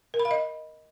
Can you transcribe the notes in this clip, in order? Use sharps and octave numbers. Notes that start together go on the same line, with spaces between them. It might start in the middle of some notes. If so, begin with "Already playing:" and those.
A#4
B5
F5
D#5